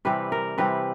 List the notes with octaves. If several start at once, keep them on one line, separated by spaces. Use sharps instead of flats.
C3 E3 G3 C4 B4
A#4
C3 E3 G3 C4 B4